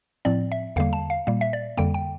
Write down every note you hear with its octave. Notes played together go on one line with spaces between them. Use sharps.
A2 F3 C4 D5
E5
E2 D3 G3 A#3 F5
A5
F5
A#2 G3 A#3
E5
D5
F2 D3 G3 A#3 G5
G5